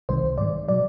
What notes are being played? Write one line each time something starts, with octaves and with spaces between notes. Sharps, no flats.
C2 C3 D#3 G#3 C5
G#2 D#3 G#3 D5
B2 F#3 D5